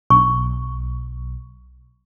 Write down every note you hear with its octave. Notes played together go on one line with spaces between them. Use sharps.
B1 C#6